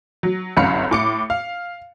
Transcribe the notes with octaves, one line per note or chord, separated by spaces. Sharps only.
F#3
G1 C2 F#2 F5 B5 C#7
A2 D6 C#7
F5